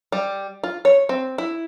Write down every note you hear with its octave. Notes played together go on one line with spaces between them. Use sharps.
G3
F4
C#5
C4
E4